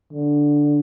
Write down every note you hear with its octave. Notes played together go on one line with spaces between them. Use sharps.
D3